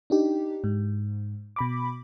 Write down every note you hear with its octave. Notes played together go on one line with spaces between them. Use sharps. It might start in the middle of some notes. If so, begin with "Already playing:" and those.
D4 D#4 G4
G#2
B2 B5 D6